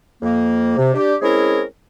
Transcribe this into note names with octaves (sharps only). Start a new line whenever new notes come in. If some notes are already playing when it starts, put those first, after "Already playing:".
F2 A#3
C3
D4 G4
G#3 C4 C#4 E4 G#4 A#4